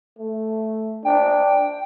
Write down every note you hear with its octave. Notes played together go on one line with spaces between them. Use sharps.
A3
D4 G5